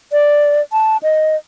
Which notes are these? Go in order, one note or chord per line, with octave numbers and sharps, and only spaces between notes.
D5
A5
D#5